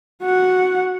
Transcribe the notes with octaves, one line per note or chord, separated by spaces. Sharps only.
F#4 F#5